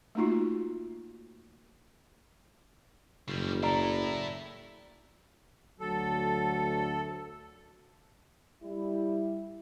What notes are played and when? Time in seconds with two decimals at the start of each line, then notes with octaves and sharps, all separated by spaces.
0.15 A3 A#3 D#4 F4 F#4
3.28 F#1 C#3 G3
3.63 E4 A4 D5 A#5
5.80 D2 F#3 A4
8.63 G3 E4